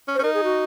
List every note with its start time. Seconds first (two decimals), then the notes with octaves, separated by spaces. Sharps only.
0.08 C#4
0.15 C5
0.19 C#4
0.23 D#4 A#4
0.34 G#4
0.44 F#4